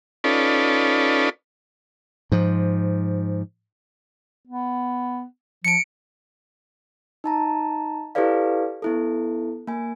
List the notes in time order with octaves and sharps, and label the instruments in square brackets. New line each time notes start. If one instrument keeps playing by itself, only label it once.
[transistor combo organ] C#4 D#4 F4 A4 B4 D5
[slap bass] G#2 F3
[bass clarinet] B3
[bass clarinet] F3 [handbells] C#7 D7
[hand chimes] D#4 A5 A#5
E4 G4 A4 B4 D5 F5
B3 E4 A4
A#3 G#5